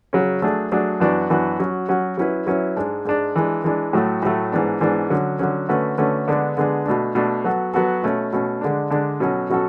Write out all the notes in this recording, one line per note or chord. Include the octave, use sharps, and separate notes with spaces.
C#3 F#3 C#4
F#3 A3 D4 G#4
F#3 A3 D4 G#4
F#2 E3 B3 D4 F#4
F#2 E3 B3 D4 F#4
F#3 C#4 F#4
F#3 C#4 F#4
F#3 C#4 E4 B4
F#3 C#4 E4 B4
G#2 G#3 D4
G#2 G#3 D4
E3 G#3 D4
E3 G#3 D4
A2 F#3 A3
A2 F#3 A3
G#2 E3 B3 D4
G#2 E3 B3 D4
D3 F#3 C#4
D3 F#3 C#4
D3 A3 C#4 F#4 B4
D3 A3 C#4 F#4 B4
D3 G#3 B3 D4 G#4
D3 G#3 B3 D4 G#4
B2 A3 D4
B2 A3 D4
F#3 B3 F#4 A4
F#3 B3 F#4 A4
B2 A3 C#4
B2 A3 C#4
D3 G#3 D4
D3 G#3 D4
B2 F#3 C#4 F#4 A4
B2 F#3 C#4 F#4 A4